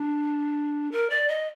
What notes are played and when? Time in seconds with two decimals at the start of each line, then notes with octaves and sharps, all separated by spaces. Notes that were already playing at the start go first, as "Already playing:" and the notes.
Already playing: D4
0.92 A#4
1.10 D5
1.28 D#5